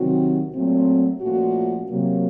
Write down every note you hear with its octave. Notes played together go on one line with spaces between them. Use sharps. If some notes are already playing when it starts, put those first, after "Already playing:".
Already playing: C3 D#3 F#3 C4 F#4
A#2 F#3 A3 C4
A#2 F3 A3 C#4 F#4
C3 F#3 A#3